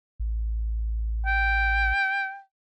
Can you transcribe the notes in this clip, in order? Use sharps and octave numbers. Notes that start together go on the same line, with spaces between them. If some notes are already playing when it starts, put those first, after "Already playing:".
A1
G5